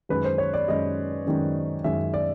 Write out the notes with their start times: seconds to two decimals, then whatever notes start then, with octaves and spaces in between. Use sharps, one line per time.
0.09 F#2 D#3 G#3 C#4 B4
0.24 C5
0.38 C#5
0.54 D5
0.67 F#2 D#3 G#3 C#4 D#5
1.26 F#2 D#3 G#3 C#4
1.84 F#2 D#3 G#3 C#4 E5
2.14 D5